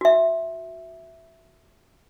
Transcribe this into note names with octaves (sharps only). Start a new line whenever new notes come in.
F#4 E5